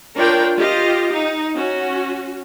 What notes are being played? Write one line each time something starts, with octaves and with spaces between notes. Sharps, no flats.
D4 F4 A#4 C#5 G5
F4 G4 D#5 F5
D#4
C#4 F#4